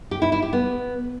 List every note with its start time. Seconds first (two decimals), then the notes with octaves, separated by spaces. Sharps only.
0.11 G4
0.22 E4
0.32 E4
0.42 G4
0.53 B3